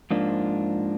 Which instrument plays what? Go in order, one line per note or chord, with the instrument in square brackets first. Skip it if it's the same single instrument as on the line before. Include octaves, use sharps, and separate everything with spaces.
[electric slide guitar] G#2 F3 A#3 D4